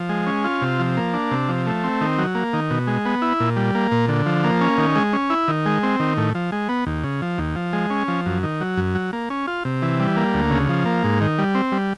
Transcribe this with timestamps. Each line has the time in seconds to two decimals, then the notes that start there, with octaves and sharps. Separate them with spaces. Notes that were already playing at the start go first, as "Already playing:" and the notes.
Already playing: F3
0.09 G#3
0.27 C#4
0.44 F4
0.62 C3
0.79 F3
0.97 A#3
1.14 D4
1.31 C3
1.49 F3
1.67 A3
1.84 C4
2.01 D#3
2.18 F#3
2.35 A#3
2.53 D#3
2.70 B2
2.87 G#3
3.06 B3
3.22 E4
3.40 A#2
3.56 G3
3.75 A#3
3.91 A#2
4.08 D3
4.26 F3
4.44 A#3
4.61 C#4
4.78 D#3
4.95 G#3
5.13 C#4
5.30 E4
5.48 D#3
5.66 G#3
5.83 C4
6.00 D#3
6.17 A2
6.35 F3
6.52 G#3
6.69 B3
6.87 D#2
7.04 C#3
7.22 F3
7.38 D#2
7.56 F3
7.73 G#3
7.90 C#4
8.08 F3
8.26 F#2
8.43 D#3
8.61 F#3
8.77 F#2
8.95 F#3
9.13 A#3
9.30 C#4
9.47 F4
9.65 C3
9.82 E3
10.00 G3
10.17 A#3
10.34 D2
10.51 C#3
10.69 F3
10.86 A#3
11.04 G#2
11.21 D#3
11.39 G3
11.55 C4
11.72 G3